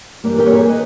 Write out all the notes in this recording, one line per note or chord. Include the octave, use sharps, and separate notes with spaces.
G2 E3 G3 A#3
G4 A#4
C#5
G#4 B4
B4 D#5